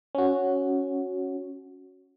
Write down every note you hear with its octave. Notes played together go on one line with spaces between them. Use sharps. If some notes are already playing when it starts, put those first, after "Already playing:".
C#4 F#4